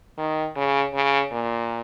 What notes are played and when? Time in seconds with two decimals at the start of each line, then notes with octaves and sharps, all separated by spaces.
0.18 D#3
0.56 C#3
0.94 C#3
1.32 A#2